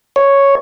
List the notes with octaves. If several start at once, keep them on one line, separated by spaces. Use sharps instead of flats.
C#5